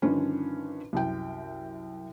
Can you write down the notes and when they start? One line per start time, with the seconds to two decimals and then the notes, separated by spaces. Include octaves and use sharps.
0.02 G2 D3 D#3 F3 C#4 D4
0.93 C2 F#2 G5